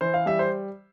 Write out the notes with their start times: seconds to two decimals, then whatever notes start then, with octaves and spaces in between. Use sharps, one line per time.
0.01 E3 C5
0.14 F5
0.26 G3 E5
0.39 C5